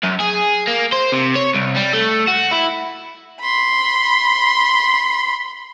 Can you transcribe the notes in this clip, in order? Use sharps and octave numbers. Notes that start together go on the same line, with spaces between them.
F#2
G#4
A#3
C5
C3
C#5
C2
G3
A3
F#4
E4
B5 C6